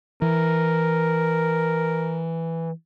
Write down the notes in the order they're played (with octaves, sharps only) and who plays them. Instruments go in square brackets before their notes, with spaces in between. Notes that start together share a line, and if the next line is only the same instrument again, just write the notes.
[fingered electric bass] E3 [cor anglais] A#4